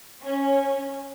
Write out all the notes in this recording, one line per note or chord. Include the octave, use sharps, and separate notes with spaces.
C#4